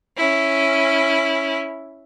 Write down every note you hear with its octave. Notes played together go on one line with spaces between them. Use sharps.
C#4 E4